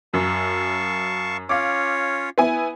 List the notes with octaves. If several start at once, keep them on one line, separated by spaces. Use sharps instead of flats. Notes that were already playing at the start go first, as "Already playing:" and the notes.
F#2 F5 A5 C#6
C#4 F4 C#5 F5 D6
B3 E4 G#5